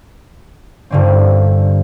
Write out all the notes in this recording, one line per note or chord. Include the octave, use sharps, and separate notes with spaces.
G2 D3 C4